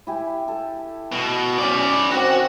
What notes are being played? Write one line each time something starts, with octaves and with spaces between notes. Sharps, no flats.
E4 G4 G#5
A4
B2
C#4 B4 D5 F#5 G#5
D#3 C4 F#4